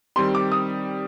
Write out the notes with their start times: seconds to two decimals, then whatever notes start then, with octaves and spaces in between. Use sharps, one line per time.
0.16 D#3 G3 C4 G4 C6
0.35 D6
0.52 D#6